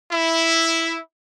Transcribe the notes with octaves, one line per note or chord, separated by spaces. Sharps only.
E4